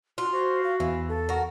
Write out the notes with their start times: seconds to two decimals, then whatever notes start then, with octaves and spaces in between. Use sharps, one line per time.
0.18 F4 F#4
0.33 F#4 C5
0.63 F5
0.80 E2 E3 F5
1.09 A4
1.29 F#4 A#4